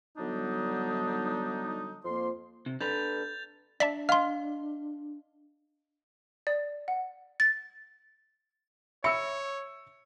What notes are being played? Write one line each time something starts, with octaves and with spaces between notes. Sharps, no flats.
D3 F#3 G3 B3 D4 D#4
F2 F3 A#3 C6
C3
D4 A4 B4 G6 A6 F7
D4 D5 E5 A5 B6
D#5 F5 C6 F6
D5
F#5
A6
C#5 E5 B5 E6 C#7